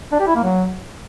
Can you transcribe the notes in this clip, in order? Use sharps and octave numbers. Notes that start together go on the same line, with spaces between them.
D4
G4
E4
A#3
F#3